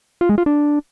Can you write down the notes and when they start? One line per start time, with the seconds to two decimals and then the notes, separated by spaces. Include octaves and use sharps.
0.21 F4
0.29 G#3
0.38 F4
0.46 D4